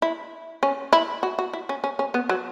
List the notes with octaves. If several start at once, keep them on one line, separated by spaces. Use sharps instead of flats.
E4
C#4
E4
F#4
F#4
E4
C#4
C#4
C#4
B3
F#3